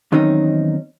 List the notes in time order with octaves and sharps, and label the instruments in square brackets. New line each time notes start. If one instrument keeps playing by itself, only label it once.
[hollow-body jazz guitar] E2 D#3 F#3 C4 C#4 D#4